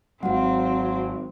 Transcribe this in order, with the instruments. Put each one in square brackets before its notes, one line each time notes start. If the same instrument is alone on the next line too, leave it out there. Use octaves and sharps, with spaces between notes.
[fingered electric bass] G#1 G#3 [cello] F#3 C4 [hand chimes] F#4 F5 F#5